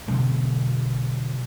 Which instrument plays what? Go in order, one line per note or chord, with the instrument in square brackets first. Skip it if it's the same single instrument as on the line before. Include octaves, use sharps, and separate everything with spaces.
[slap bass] B2 D3 F#3 G#3